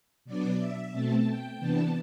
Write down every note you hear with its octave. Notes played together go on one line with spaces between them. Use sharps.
B2 F#3 B3 D4 D5
E5
B2 A3 C4 A5
G5
C3 E3 B3 D4 A5